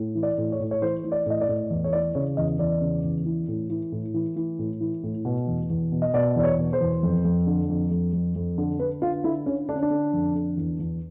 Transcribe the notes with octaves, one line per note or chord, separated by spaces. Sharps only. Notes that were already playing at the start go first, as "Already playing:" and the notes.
Already playing: A2
E3
D5
A2
C#5
A2
C#5
E3 C5
E3
D5
A2 D#5
D5
A2
E2
C#5
E3 D5
C#3 C#5
E2 D#5
E2 D5
C#3
E2
E3
A2
E3
A2
E3
E3
A2
E3
A2
B2
E2
E2
B2
D#5
B2 D5
E2 D5
C#5
B2
C5
E2
F2
F2
D3
F2
F2
F2
F2
D3
D3 B4
D3 F4
D3 E4
D3 C#4
D3 D4
C#4
D4
D3
F2
D3
E2
E2